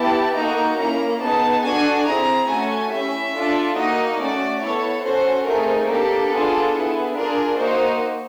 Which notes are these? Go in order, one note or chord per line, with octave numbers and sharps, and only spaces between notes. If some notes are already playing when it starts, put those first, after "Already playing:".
Already playing: B3 E4 G4 A5
A#3 D#4 F#4 A4 A#5
A#3 C#4 E4 A#5
B3 D#4 G#4 A5
D4 F#4 A4 G#5
C4 E4 G#4 A#5
A3 C#4 F#4 A4 G#5
C#4 E4 G4 E5
D4 F4 A4
A#3 D#4 F#4 D#5
A3 C#4 F#4 D5
B3 E4 A4 C#5
C#4 F#4 A4 C5
A3 C4 D#4 G#4 A#4
A#3 D4 G4 A4
B3 D4 F4 G#4
B3 E4 G#4
D4 F4 G#4 A#4
A#3 D#4 F#4 C5